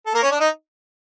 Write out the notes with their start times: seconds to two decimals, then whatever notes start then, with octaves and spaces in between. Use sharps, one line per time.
0.06 A4
0.14 A#3 A#4
0.22 C#4 C#5
0.31 D4 D5
0.40 D#4 D#5